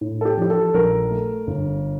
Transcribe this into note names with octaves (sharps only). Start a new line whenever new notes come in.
A2
A4
G4
F3 G4
A4
A#1 A#4
A3
G1